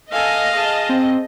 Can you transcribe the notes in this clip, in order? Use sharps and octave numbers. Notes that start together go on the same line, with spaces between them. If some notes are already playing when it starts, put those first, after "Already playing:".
A4 D#5 F5 G#5
G#4 A5
C4